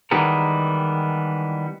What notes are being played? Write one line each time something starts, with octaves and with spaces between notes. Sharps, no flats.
D#3 E3 G3 G#3 B3 A#4